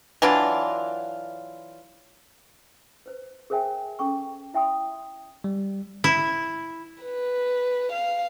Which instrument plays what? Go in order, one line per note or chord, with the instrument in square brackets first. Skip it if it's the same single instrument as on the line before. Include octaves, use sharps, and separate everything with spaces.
[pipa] E3 F#3 D4 F4
[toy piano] B4 C5
G#4 A#4 C5 E5 G5 G#5
C#4 A4 G5 C#6 D6
E4 E5 G5 C6 D#6
[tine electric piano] G3
[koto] E4
[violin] B4
F5